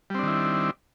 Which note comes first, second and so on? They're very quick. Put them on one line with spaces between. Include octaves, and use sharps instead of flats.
G3 C4 D4 D#3 E4